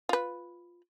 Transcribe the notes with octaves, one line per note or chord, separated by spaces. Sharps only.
F4 B4